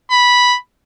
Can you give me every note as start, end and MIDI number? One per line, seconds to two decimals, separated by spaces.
0.10 0.54 83